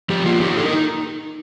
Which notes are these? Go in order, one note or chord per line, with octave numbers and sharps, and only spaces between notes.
F3 G4
A#3 F4
D#4 G4
D#4 A4
A#4